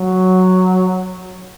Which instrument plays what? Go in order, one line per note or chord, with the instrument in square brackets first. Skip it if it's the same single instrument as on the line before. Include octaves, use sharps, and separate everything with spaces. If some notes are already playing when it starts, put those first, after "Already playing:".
Already playing: [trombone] F#3